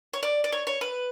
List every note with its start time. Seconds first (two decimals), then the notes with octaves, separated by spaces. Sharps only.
0.13 C#5
0.23 D5
0.44 D5
0.52 C#5
0.67 C#5
0.81 B4